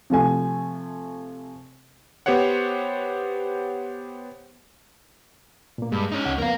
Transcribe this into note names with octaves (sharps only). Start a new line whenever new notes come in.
C3 F3 A3 G#5
B3 G4 C5 C#5 F#5
A#2 A#3
G2 G#3
C#4 D#4
C#2 F#5
F2 A#3 B3 A#4 F5